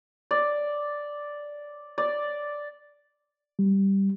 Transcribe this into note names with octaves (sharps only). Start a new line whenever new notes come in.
D5
D5
G3